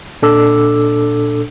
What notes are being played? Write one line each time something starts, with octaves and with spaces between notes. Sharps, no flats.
A#2 D4 A4 D6 E6